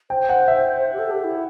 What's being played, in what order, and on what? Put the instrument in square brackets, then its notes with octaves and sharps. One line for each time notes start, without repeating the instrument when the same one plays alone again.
[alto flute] C5 [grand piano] G5
[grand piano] F#5
E5
[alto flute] G4
A4
G4
E4